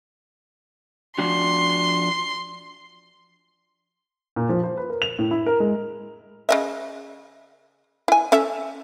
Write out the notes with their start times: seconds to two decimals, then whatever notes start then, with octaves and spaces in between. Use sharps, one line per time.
1.18 F3 D4 F#4 C6
4.36 A#2
4.49 F3
4.63 C5
4.77 B4
4.90 A#4
5.02 F7
5.19 A2
5.31 E4
5.46 A#4
5.60 G#3
6.49 C#3 D#5 E5
8.08 E4 G#5
8.32 C#4 A4 E5